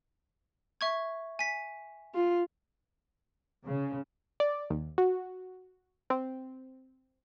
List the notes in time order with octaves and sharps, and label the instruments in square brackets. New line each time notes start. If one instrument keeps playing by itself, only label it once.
[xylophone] E5 C#6 G#6
G#5 B6
[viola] F4
[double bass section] C#3
[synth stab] D5
D#2
F#4
C4